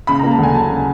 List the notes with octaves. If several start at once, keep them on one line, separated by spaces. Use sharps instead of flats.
C#3 B5
A#3 A#5
A5
D2 G#5
F#3 A5
C#3